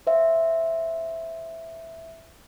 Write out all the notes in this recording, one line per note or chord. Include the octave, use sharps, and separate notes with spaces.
C5 E5 F5